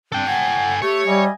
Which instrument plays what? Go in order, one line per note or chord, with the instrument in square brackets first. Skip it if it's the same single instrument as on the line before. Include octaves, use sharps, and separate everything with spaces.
[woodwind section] G3 C4 D4 [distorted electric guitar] A4 G5
[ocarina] F#5 [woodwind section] G#5
[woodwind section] A3 [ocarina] G4 [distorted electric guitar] C#5
[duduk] G3 [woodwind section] D#5 E5 G#5